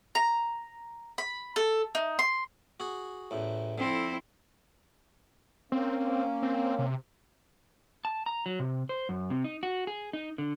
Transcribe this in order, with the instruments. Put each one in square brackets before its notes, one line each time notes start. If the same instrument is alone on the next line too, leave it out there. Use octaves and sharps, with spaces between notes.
[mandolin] A#5
B5
A4
D#4
C6
[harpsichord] F#4 G#4
A1 E2 A2
[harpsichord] F2 D3 [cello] C4 E4
[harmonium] A#3 C#4 [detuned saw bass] C4
[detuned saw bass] C4
C3
[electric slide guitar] A5
A#5
F#3
C3
C5
F#2
C3
D#4
F#4
G#4
D#4
D3